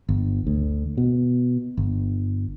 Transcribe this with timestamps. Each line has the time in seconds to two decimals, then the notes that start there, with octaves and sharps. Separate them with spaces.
0.09 G1
0.47 D2
0.97 B2
1.77 G1